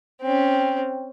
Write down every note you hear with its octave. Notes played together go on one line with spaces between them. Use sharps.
C4 C#4